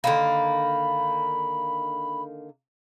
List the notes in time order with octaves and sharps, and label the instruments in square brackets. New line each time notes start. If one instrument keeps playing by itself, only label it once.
[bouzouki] D3 D#3 A#3 [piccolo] B5